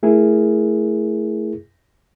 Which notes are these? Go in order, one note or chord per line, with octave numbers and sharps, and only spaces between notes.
A3 E4 G#4 A#4